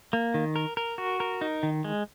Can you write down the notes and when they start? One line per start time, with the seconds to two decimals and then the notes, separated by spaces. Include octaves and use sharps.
0.13 A#3
0.34 D#3
0.56 A#4
0.77 A#4
0.98 F#4
1.20 A#4
1.41 D#4
1.63 D#3
1.85 G#3